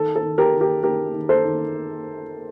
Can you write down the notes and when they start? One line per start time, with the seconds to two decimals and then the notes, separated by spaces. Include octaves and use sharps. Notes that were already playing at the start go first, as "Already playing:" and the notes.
Already playing: D#3 A4
0.16 A4
0.23 D#3
0.38 G4 A#4
0.54 D#3
0.61 G4 A#4
0.83 D#3 G4 A#4
1.14 D#3
1.29 A4 C5
1.45 D#3